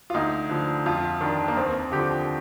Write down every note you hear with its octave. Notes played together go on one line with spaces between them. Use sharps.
F4
D2 D#4
D3 F3
F2 F4
D#3 D4
A#3
D#2 C4
D3 F3 G4